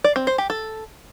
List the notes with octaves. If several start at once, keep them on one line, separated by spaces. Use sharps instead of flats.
D5
C4
C5
G4
A4